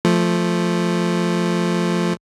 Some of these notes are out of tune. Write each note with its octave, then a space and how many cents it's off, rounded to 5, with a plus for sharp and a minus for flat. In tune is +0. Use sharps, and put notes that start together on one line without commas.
F3 +0 A3 +0